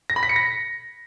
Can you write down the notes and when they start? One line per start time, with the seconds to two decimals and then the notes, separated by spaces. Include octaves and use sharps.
0.10 A#6
0.16 B5
0.23 B6
0.29 C#7
0.36 A#6